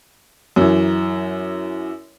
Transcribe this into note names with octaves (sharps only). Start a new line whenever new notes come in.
F#2 E3